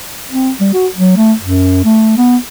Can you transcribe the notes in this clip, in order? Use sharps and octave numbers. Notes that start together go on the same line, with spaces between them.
C4
G3
F#4
F#3
A3
F#2
A3
B3